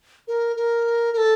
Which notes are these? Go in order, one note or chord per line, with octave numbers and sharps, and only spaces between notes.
A#4
A#4
A#4
A4